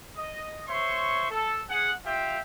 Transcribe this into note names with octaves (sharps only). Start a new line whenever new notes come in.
D#5
C5 C#5 E5 C6 C#6
A4
G#4 F#5
F4 G4 E5 F5 G5